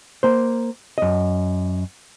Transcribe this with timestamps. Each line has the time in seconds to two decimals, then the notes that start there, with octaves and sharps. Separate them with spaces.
0.23 A#3 C5
0.98 F#2 D#5